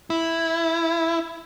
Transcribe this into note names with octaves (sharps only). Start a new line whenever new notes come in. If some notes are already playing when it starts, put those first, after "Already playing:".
E4